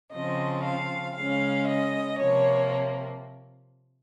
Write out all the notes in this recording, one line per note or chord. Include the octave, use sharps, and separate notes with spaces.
C#3 F3 C4 D#5
F5
C#3 G#3 C#4 F5
D#5
C3 F3 A#3 C#5